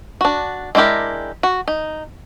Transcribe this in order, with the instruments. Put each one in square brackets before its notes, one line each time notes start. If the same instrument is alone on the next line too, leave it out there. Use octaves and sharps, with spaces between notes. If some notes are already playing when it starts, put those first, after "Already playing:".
[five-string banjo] D4 F#4
G#3 D4 E4 G4 A#4
F#4
D#4